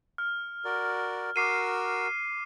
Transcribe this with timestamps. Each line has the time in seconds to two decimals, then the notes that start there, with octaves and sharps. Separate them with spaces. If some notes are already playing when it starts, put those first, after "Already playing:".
0.18 F6
0.65 F#4 A#4 D5
1.36 F#4 A#4 D6 E6 C7 D#7